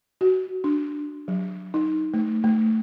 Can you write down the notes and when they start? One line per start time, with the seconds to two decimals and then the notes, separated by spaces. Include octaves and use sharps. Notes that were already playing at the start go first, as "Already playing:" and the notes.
0.21 F#4
0.64 D4
1.28 F#3
1.74 D#4
2.14 A3
2.44 A3